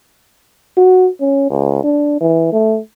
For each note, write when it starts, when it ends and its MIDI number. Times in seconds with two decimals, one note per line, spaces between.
0.77 1.09 66
1.21 1.48 61
1.50 1.82 37
1.83 2.16 62
2.21 2.49 52
2.53 2.79 57